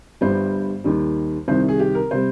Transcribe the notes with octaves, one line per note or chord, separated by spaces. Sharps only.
G1 G2 G3 C5
D#2 D#3 G3
C2 C3 D#3 C5
G#4
G4
A#4
C3 G3 C5